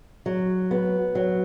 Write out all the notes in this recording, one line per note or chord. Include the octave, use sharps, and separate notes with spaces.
F#3
B3
F#3